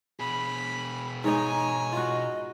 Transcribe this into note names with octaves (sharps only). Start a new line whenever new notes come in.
B2 G#4 B5
G#2 D#4 C#5 G#5 A#5
F4 F#4 D#5